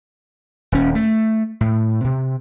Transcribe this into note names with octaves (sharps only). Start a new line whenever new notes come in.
D#1 C#4
A3
A2
C3